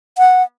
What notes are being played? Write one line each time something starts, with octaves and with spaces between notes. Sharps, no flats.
F#5